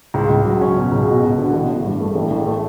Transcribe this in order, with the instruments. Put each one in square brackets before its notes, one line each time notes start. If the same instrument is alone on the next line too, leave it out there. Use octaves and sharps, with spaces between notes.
[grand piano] C#2
C#2
F#3
C#4
B2
C#2
B2
B2
D3
A1
A1
G2
A3
A1
A1
A3